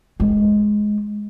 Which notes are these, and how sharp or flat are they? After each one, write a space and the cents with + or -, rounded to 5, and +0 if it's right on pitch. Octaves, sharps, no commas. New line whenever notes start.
G#3 +10